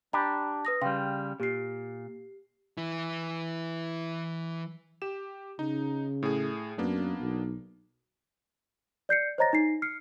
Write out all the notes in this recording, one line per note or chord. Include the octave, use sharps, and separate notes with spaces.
D4 G4 A#5 B5
B4 D#6 A#6
C#3 G3 F5 G5 C6
A#2 G4 C7
E3 E4
G4 E7
C#3 D#4
A2 G#4
F#2 A#3 B3 D4
B1
D5 G6 C7 C#7
C5 C#5 D#5 A#5 A6 A#6
D#4 C7
F6 C7 C#7